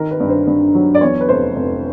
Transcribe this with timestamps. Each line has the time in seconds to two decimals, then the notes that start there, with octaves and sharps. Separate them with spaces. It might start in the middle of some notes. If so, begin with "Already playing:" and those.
Already playing: D#3 A#4
0.11 B4
0.20 G2
0.29 C5
0.47 G2
0.75 F#3
0.95 D5
1.01 E2 C#5
1.21 B4
1.29 F1 C5
1.56 F1